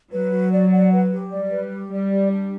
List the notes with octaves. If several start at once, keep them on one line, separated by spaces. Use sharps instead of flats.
F#3 B4
F#4
D5
F#5
B4
G4
G3 D5
B4
G4
G3 D5
G4
D4